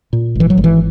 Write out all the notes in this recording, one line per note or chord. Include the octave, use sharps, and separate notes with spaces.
A#2
G#1 E3
F#3
G#1
E3